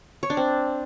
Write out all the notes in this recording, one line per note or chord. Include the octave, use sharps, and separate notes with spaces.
C#5
D4
C4